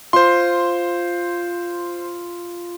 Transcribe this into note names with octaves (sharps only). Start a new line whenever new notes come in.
F4 C5 C6